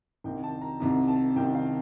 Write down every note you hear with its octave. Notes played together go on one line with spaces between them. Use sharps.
C2 C3 D#3 G5
A5
A#5
C2 C3 D#3 A#5
A5
C2 C3 D#3 G5
F5